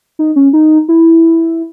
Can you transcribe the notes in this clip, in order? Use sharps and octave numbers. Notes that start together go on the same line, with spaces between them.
D#4
C#4
D#4
E4